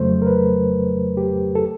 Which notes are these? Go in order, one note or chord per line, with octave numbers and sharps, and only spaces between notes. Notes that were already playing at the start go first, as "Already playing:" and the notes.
Already playing: F2 C#3 F#3 A3 C5
A#4
B4
G4
A4